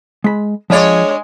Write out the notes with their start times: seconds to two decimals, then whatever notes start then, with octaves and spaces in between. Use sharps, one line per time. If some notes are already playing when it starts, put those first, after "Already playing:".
0.24 G#3 B5
0.70 F3 G#3 D4 C#5 D5